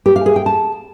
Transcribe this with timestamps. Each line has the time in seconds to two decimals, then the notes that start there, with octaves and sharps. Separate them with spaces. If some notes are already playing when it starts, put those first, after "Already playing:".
0.06 G4
0.16 F5
0.26 G#4
0.36 G5
0.46 A5